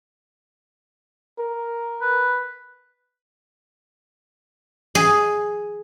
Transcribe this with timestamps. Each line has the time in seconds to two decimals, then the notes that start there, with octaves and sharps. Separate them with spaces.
1.38 A#4
2.01 B4
4.95 G#4